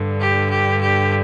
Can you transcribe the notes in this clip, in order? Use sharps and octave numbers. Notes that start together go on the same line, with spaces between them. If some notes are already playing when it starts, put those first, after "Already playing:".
Already playing: G2 D3
G4
G4
G4